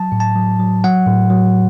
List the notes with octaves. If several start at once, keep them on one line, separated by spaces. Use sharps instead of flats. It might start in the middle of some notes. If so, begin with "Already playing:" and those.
Already playing: F#3 A5
A2
A5
F#3
F#3
F#3 F#5
A2
F#3